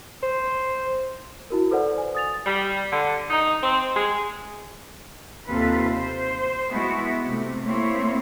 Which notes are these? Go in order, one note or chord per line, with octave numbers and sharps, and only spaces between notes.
C5
E4 F#4 A#4
A4 B4 C5 D5 F#5
G#5
D#6 A6 F7
G3
D3
D#4
C4
G#3
D#2 C3 C4 F4 A4 B4
C5
G#3 B3 E4 F#4
C3 A3
A3 A#3 C4 E4 C#5